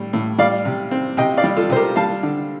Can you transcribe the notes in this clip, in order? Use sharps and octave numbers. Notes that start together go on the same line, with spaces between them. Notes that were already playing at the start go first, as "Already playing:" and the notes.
Already playing: A2 G3
A2
G3 D5 F5
C3
C4
C3 D#5 G5
D5 F5
G3
F4 A4
C3 C5
G4 A#4
G3 F5 A5
D3